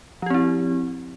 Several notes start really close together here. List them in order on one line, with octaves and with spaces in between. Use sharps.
F3 G4 C4 E4